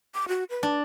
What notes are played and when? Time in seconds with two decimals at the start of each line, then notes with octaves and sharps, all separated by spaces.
0.15 D6
0.28 F#4
0.50 B4
0.63 D4